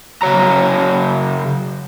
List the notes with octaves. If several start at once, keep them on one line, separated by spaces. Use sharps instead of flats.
C#3 F#3 C#5 A#5